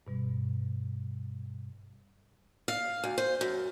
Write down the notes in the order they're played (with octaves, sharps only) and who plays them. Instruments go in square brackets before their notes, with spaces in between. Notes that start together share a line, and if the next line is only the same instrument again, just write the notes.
[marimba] G2 B2 G3
[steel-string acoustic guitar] F5
D2
C5
F#2